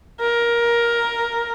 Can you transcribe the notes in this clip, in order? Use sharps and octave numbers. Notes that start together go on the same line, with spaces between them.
A#4